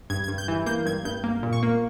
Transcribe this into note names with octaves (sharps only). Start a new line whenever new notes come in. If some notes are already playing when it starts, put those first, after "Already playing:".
G2 G#6
G#6
G2
G6
E3
A#3 G6
G2 G#6
G2 G6
A#3
A#2
C#6
A#3